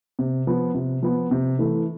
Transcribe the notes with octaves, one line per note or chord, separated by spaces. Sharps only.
C3
F3 B3
C3
F3 B3
C3
E3 A3